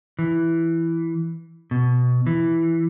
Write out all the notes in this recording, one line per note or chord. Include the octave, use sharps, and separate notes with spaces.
E3
B2
E3